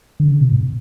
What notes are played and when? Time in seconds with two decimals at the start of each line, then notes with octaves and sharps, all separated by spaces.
0.20 D3
0.31 C#3
0.41 B2
0.52 G#2